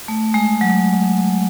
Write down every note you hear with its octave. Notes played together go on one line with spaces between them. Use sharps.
A3
G#3
F#3